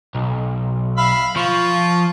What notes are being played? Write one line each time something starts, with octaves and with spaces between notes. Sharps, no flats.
B1
E5 F5 B5
F3 F4 C#6